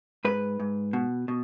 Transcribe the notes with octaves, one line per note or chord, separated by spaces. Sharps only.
G#2 B4
G#2
B2
B2